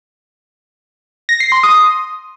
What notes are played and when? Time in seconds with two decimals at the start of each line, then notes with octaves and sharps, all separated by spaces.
1.29 A#6
1.40 C7
1.52 C6
1.63 D#6